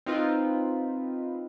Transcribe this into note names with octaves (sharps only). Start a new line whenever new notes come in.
C4 D#4 F4 B4